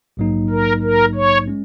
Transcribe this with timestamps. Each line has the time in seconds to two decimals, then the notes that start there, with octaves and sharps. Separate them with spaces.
0.17 A#1 G#2 F#3 A#3 D#4
0.50 A#4
0.82 A#4
1.15 C#5
1.48 G#3 C#4